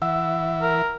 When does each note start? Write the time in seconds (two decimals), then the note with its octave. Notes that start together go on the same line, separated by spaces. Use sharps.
0.02 E3 E5 F#5 E6
0.62 A#4